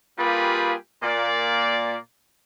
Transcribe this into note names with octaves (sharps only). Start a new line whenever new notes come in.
G3 A#3 F4 G4 G#4 B4
A#2 A#3 D5